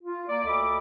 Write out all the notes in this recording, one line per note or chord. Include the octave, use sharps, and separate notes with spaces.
F4
A#3 D5
D2 A4 D#5 B5 D6